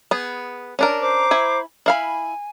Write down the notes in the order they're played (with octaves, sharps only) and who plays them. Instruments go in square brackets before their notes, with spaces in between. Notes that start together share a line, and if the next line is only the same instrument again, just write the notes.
[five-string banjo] B3 G#4
C#4 D4 A#4
[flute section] C5 A#5 D6
[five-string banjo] E4 G#5
[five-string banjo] E4 F5 B5 [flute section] G#5